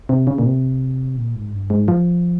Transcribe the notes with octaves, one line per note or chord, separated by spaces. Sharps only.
C3
C#3
A#2
C3
A#2
G#2
G2
G#2
F3